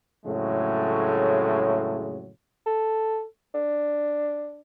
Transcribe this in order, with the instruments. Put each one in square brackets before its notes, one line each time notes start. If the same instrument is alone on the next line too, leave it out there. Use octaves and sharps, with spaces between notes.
[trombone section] F2 A2 C#3 F#3 G#3 A3
[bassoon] A4
D4